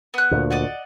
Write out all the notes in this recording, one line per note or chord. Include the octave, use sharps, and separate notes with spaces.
B3 F#6
D2 A#2
D5 D#5 F#5